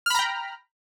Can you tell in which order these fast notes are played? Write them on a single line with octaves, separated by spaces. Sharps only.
F6 B5 A#5 G5